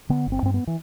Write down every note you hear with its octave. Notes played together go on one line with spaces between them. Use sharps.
D3 B3
G1
C4
G2 C4
B3
E3